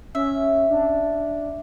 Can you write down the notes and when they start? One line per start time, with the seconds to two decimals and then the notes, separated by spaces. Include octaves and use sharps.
0.15 C#4 E5
0.70 D4